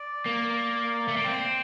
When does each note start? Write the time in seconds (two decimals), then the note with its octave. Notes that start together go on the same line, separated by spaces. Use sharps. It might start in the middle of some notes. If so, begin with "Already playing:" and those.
Already playing: D5
0.26 A#3
1.08 A3
1.17 A#3
1.24 C4 C5